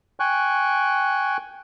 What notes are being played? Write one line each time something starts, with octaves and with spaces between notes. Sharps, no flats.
G5 G#5 C#6 F#6